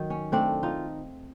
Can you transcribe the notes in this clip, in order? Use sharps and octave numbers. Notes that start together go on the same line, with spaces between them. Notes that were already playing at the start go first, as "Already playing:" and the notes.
Already playing: D#3 F#3
C#4
A3 C4 D4
D#4 F4